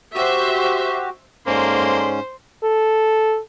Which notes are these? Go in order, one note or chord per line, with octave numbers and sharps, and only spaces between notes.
F#4 G4 C5 E5
G#2 A#3 C#4 A4 C5 D5 C6
A4